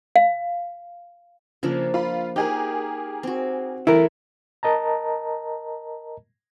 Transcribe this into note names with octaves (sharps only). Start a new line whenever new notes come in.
F5
C#3 F3 A#3 D4
F4 B5
D#4 G4 G#4 A#4
C4 F#4
E3 A3 E4 A#4
A#4 D#5 A5 A#5